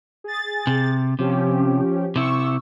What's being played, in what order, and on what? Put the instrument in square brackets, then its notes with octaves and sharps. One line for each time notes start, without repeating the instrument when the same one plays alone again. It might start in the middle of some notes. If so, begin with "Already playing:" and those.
[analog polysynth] G#4 A6
[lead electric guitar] C3
[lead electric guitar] C3 [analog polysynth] F3 C#4 G4
[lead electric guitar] C3 E4 [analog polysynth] C#6 E6